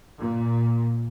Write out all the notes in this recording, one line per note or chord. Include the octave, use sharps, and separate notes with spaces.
A#2